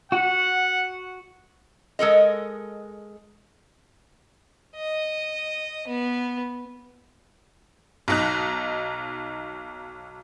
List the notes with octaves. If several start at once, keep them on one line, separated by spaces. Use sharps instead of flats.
F#4 F#5
G#3 A4 A#4 D#5
D#5
B3
B1 D#4 F#6